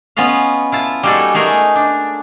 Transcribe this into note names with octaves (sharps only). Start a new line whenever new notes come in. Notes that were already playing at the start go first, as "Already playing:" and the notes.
B3 C#4 F4 D#5 F5
E4 F4 A5
G3 A#3 D#4 F#4 G#4 A4
A3 D#4 G#4 A#4 B4
D4